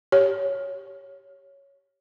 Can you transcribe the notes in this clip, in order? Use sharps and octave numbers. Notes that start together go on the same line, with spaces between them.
G4 C#5